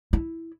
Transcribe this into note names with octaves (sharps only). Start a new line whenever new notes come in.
E4